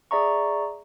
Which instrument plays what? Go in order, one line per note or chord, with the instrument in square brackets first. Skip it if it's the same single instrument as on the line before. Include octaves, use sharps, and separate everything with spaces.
[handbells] G#4 D5 E5 A#5 C#6